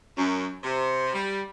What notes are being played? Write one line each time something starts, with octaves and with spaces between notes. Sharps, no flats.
F#2
C3
G3